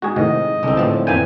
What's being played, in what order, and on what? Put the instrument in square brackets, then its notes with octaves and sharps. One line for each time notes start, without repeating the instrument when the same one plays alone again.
[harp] G#2 [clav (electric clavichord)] F#4 G#4
[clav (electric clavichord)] A2 C3 D#3 [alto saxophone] D#5
[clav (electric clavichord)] C2 [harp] D3 [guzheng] G#3 C4
[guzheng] A2 A5 [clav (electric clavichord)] F3 B3
[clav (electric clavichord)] F2 A#3 G5 [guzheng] E3 B4 F5 [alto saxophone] G#5